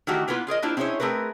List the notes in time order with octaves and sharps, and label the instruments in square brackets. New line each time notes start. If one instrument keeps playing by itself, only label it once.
[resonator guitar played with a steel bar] D#3 E3 A3 F#4 G4
A#3 B3 E4 F4 B4
F4 G#4 A#4 D#5
A#3 D4 E4 F4 G4 C5
C4 C#4 E4 G#4 C5 C#5
A3 C4 G#4 A#4 B4